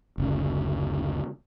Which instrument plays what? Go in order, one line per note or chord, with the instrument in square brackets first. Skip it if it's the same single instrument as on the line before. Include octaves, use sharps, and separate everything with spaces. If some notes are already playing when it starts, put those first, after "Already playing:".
[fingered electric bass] F#1 D2 C#3